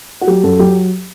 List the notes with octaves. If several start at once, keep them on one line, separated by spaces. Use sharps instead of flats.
F#4
F#3 G4
F#2 F#4 A4
F#3 G4